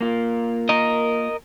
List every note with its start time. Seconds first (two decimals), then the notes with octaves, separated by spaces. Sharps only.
0.01 A#3 F4
0.69 A#4 D#5